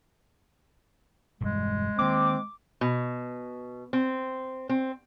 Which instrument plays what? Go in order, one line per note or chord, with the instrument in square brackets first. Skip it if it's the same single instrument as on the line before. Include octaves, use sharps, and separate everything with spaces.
[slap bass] E1 G2 [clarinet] G#3
[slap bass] D#3 A#3 [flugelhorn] C4 [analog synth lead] D6
[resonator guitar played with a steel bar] B2
C4
C4